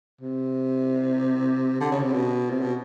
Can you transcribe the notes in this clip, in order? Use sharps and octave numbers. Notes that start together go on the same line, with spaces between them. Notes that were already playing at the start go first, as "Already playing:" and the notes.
C3
D3
C#3
C3
B2
C3
B2